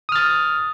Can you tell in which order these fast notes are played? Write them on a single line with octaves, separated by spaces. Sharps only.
D#6 F6 A6